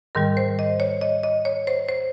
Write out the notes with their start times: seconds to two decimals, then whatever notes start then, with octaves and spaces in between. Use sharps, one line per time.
0.15 G#2 D#3 G3 A#4
0.37 C5
0.59 D#5
0.80 C#5
1.01 D#5
1.23 D#5
1.45 C#5
1.67 C5
1.88 C5